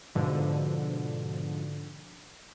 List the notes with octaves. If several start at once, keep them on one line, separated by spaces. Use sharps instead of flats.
G#2 B2 D3 F3